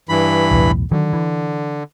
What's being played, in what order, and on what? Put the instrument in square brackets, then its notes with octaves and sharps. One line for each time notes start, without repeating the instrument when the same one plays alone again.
[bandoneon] G2 E3 B5
[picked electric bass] B1 E2 A2
[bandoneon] D3 [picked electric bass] D#3 F#3
[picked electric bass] E3